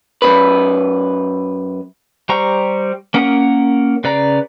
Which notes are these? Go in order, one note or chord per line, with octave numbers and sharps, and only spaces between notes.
F#2 B2 B4
G3 G4 C5 A#5 C#6
A#3 C#4 A#4 F#5 D#6
C#3 B4 D5 A#5